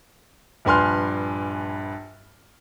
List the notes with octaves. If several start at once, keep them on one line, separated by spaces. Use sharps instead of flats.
A#1 G2 B4 G#5 C6 F6